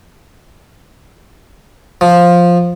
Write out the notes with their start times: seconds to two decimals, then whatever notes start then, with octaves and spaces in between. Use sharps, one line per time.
2.01 F3